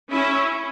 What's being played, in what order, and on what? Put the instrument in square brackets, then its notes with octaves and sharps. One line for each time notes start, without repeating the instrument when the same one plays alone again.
[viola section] C#4 E4